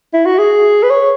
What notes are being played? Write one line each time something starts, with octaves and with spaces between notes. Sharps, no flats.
E4
F#4
G#4
B4
C#5